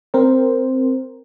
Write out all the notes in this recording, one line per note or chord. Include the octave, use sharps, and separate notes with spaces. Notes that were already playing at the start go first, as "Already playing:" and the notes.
C4 A#4 C5